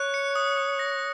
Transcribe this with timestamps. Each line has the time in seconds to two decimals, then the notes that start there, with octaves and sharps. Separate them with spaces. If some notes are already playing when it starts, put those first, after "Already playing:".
Already playing: C#5 F#6
0.14 C#7
0.35 D#6
0.57 D#6
0.79 A#6